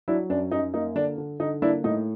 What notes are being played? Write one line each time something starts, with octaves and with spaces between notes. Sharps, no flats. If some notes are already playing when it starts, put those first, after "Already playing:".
F#3 D4 E4
F#2 D4
F#2 D#4
A#3 D#4
D3 D4
D3
D3 D#4
A#3 D4 E4
A2 D#4